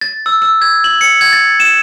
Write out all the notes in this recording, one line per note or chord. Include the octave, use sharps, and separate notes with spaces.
A6
E6
E6
G#6
F#7
C#7
G#6
A6
E7